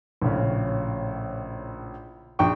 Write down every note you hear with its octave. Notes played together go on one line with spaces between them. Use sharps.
A#1 A2 C#3
A#1 G5 C#6